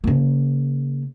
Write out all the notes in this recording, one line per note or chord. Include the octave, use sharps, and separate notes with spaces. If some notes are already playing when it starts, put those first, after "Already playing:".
C#3 A#3